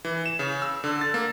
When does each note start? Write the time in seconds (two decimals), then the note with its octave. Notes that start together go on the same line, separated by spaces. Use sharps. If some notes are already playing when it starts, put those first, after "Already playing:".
0.05 E3
0.26 E7
0.39 C#3
0.62 E6
0.84 D3
1.01 A6
1.14 A#3